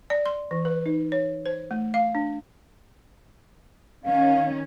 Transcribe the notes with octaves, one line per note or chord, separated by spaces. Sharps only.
D5
C6
E3
B4
D#4
C#5
C5
A3
F5
D4
D#3 C#4 F5